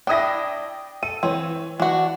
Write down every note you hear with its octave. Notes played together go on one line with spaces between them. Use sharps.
D4 E4 G5 D#6 A#6
A4 D#7
E3 C4 C#5
E3 D4 F#4